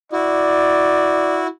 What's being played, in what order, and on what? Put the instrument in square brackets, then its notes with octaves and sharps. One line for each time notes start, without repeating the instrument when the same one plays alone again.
[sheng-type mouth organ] E4 F#4 [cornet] D5